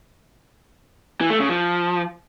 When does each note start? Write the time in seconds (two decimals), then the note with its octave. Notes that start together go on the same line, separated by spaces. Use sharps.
1.21 E3
1.30 A3
1.40 C#3
1.49 F3